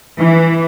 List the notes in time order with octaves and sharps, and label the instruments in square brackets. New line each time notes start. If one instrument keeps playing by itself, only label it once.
[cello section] E3